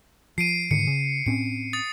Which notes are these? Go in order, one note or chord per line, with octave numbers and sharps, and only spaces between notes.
F3 C7 D7 D#7
G#2 D3 D#3 C#7
C#3
A2 C4 C#4 C#7
D#6 A6